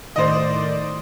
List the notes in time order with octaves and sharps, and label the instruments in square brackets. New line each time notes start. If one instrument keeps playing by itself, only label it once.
[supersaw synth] A2 D#3 D5 [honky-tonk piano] C5 D#5